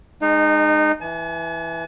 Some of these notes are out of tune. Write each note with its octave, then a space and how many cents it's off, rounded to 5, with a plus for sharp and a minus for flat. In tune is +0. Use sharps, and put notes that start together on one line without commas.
G#3 +0 D#4 -25
E3 +0 G#5 +45